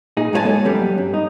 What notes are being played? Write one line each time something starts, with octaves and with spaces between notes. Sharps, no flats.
A#2 D#4 G#4
G#2 F#3 E4 C5 G#5 A5
G#3 A#3 A4 C#5
F#2 G3 B3 C#4
G2
D#4